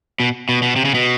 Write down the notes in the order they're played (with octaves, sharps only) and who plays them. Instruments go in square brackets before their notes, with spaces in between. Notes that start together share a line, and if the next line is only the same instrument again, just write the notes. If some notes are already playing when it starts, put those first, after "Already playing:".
[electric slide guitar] B2
B2
B2
C3
C#3
B2